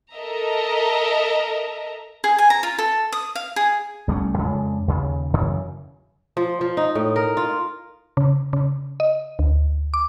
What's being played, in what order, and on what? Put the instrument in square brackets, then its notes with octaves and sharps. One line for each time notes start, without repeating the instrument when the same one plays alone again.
[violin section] A4 A#4 D#5 E5 A#5
[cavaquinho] G#4
G#5
A#5
F4
A4
D#6
F5
G#4
[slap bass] C2 G3 A3 C#4
F2 C#3 G#3 D4
D#2 C#3
F#2 C#3 E3
[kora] F3
F3
D#4
A2
A#4
F4
[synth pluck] C#3
C#3
D#5
D2
D6